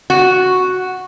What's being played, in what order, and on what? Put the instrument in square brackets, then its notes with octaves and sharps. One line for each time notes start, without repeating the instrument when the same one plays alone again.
[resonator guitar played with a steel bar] F#4